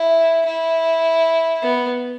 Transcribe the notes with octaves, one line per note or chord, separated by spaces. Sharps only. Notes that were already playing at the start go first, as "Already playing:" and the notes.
Already playing: E4
E4
B3